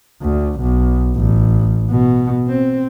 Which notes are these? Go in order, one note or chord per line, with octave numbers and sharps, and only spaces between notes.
D2
B1
A1
B2
C4